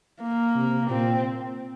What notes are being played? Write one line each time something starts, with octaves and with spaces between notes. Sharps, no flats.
A#3
C3
A#2 C4